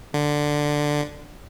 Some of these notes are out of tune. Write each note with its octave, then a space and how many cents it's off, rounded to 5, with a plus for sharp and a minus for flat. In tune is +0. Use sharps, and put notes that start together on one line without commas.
D3 +5